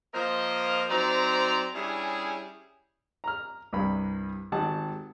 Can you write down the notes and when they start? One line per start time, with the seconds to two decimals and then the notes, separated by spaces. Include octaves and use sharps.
0.14 F3 A#3 A#4 C5 D#5
0.91 F#3 C4 D#4 C5 D5 A#5
1.74 G3 C#4 D4 E4 G#4
3.24 A#5 F6
3.73 C2 G2 B5
4.52 G#1 G4 F#5 A5